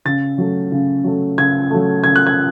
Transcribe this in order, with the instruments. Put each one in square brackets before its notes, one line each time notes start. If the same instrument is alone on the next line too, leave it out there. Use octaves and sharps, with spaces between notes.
[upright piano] C#3 A6
F#3 A3
C#3
F#3 A3
C#3 G#6
F#3 A3
C#3 G#6
F#6
G#6